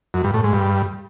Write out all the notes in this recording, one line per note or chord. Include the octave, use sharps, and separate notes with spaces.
F#2
G2
A2
G#2
G2